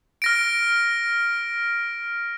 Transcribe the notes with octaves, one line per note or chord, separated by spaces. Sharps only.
F6 A#6 D7